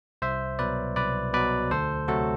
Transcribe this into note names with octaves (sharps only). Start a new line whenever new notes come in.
C2 C5 E5
B2 F#3 B4 D5
C2 B4 D5
B2 F#3 B4 D5
D2 A4 C5
C3 F#3 A3 F#4 A4